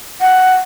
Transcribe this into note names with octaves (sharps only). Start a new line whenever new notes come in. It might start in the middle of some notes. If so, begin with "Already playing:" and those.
F#5